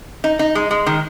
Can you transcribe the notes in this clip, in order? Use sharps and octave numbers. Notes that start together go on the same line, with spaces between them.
D#4
D#4
G#3
G#3
D#3